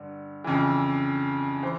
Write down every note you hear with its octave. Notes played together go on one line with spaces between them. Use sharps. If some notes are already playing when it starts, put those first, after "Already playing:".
Already playing: G2 D3
F2 C#3 E3
E3 C5